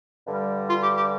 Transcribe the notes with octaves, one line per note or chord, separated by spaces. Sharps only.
G2 D3 G3
F4
G4
G4